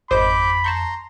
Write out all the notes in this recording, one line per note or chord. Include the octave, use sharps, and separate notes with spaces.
G#1 F2 C5 D#5 B5 D6 G6
A5 A#5 C6 C#6 G6